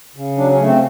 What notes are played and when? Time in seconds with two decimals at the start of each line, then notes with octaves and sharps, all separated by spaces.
0.16 C#3
0.38 F#3 D4
0.53 C#4
0.59 A3
0.67 C4